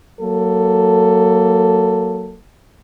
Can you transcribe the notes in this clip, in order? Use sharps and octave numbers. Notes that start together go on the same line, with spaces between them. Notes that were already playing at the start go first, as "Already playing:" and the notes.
F#3 A#3 A4